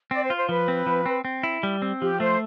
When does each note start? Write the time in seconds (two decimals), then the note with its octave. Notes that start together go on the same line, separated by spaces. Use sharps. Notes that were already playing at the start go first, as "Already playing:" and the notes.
0.11 C4 D5
0.24 C5
0.30 F4
0.36 C5
0.49 F3 B4
0.68 C4
0.86 F3
1.06 C4
1.25 C4
1.43 E4
1.63 G3
1.82 C4
2.01 F3 G4
2.20 A3 C5